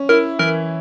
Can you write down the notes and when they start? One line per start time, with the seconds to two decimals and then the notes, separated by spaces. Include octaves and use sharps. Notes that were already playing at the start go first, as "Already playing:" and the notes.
Already playing: C#4
0.09 E4 A#4
0.39 E3 A#4